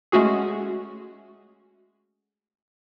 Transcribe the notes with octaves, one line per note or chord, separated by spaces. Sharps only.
G#3 A3 C#4 F#4 G#4